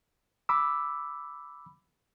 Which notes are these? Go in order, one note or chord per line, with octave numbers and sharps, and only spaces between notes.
B5 D6 E6